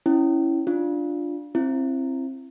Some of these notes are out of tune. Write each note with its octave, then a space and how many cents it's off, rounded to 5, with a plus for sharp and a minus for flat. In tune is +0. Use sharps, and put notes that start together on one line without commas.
C#4 +0 E4 +0
D4 +0 F4 +0
C4 +25 E4 +30